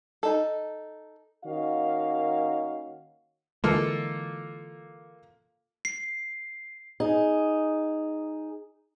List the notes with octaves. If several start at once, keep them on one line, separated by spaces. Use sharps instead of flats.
D#4 A4
D#3 A#3 C#4 F#4 D#5 F5
D3 E3 G#3 A#3 F4 A4
C7
D#4 G#4